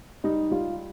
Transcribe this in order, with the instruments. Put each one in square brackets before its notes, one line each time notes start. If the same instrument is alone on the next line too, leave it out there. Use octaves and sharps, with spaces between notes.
[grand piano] G3 D#4
G3 F4